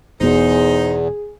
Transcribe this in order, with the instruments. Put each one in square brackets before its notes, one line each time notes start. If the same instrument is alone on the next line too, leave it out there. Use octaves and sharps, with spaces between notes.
[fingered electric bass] E1 B2 [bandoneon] E2 [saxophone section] D#4 C5 [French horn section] G#4